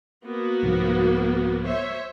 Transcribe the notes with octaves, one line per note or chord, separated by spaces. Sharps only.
A#3 B3 F#4
C2 G#2 F3
C5 C#5 E5